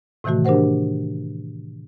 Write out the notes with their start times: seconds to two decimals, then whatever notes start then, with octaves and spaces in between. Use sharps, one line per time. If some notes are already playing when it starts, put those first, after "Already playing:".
0.24 A2 C3 D#3 E3 A3 F#4
0.45 D4 G4 A#4 C5 F#5